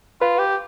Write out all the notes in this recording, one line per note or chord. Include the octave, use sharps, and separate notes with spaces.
F4 B4
G4